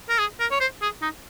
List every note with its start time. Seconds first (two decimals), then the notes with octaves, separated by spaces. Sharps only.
0.09 A#4
0.19 G#4
0.40 A#4
0.51 C#5
0.60 C5
0.82 G#4
1.02 D#4